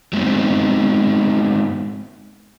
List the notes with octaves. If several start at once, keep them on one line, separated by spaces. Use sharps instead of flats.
F#3 G#3 B3 C4 D#4